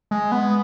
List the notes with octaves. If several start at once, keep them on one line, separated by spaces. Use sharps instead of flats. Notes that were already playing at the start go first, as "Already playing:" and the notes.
G#3
B3